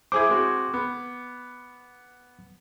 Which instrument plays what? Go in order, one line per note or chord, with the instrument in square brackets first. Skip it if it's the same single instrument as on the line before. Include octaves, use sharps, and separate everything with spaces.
[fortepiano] E4 G#4 C5 [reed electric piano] D6 G#6
[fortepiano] G#3 C4 F#4
B3